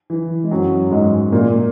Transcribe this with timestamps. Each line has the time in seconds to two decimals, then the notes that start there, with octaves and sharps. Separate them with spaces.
0.10 E3
0.44 G#3
0.51 F#2 F#3
0.91 G#2 G#3
1.32 A#2 A#3